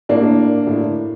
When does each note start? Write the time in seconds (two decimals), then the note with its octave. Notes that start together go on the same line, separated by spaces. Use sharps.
0.09 A2 A#3 D4
0.67 A2